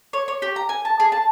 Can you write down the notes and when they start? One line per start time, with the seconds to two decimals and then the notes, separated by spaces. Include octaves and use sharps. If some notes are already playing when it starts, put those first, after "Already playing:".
0.13 C#5
0.28 C#5
0.42 G4
0.56 A#5
0.69 G#5
0.85 A5
1.00 G#4
1.12 A5